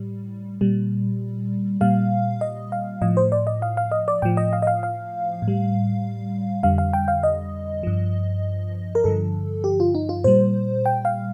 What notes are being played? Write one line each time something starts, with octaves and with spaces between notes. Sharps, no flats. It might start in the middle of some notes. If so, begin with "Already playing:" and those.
Already playing: A2 G3
A#2 G3
A#2 G3 F5
D#5
F5
A2 F3 D#5
C5
D5
D#5
F5
F5
D#5
D5
A2 F3 G5
D#5
F5
D#5
F5
F5
A2
G3
F2 D3 G3 F5
F5
G5
F5
D#5
G2 F3
A#4
G2 D3 F3 A4
G4
F4
D#4
F4
A#2 G3 C5
G5
F5